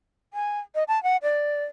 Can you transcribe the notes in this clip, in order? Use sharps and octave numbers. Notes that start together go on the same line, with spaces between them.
G#5
D#5
A5
F#5
D5